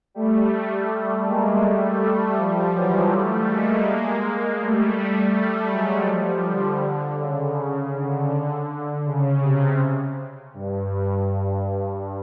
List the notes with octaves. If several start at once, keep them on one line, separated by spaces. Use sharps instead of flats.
G3 A3
G#3 A#3
G3 A3
G3 A3
F3 G3
E3 F#3
G3 A3
G#3 A#3
G3 A3
G3 A3
F#3 G#3
F3 G3
D3
C#3
D3
C#3
C3
G2